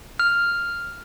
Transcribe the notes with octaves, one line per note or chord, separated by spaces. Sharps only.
F6